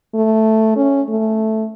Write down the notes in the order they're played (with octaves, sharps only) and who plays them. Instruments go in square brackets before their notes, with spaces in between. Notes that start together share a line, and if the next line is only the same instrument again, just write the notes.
[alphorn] A3
C#4
A3